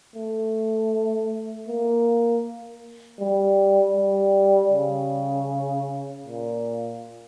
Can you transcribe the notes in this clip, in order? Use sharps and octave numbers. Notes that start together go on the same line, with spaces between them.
A3
A#3
G3
G3
C#3
A#2